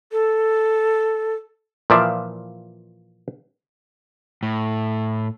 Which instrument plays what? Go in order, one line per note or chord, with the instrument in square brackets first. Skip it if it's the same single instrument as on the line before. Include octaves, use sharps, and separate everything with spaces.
[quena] A4
[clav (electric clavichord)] A#2 E3 F3 D5 E5 F5
[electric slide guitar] A2